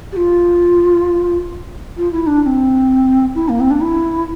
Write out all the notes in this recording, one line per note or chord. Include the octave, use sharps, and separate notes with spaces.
G4
F4
F4
E4
D4
D4
C4
E4
A#3
C4
D4
E4